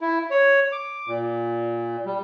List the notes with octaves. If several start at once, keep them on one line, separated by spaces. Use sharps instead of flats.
E4
C#5
D6
A#2
G3